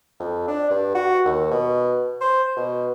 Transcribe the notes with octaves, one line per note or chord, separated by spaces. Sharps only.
F2
D4
G2
F#4
D#2
B2
C5
B2